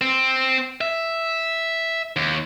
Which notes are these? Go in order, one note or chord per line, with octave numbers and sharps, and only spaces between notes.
C4
E5
D#2